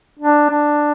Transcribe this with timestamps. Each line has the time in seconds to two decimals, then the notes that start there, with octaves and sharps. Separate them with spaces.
0.19 D4
0.50 D4